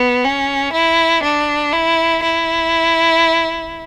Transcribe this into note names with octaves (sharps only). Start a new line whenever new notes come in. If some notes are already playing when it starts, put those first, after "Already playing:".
Already playing: B3
C#4
E4
D4
E4
E4